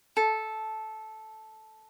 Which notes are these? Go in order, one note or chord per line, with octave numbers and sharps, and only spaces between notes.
A4